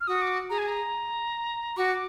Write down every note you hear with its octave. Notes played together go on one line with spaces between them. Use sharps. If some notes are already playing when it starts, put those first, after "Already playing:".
F6
F#4 D#6
D6
G#4 A#5
G#5
A#5
F#4 D6